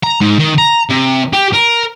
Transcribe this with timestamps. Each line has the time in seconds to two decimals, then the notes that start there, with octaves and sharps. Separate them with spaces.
0.03 A#5
0.21 G#2
0.39 D#3
0.58 A#5
0.89 C3
1.33 G4
1.53 A#4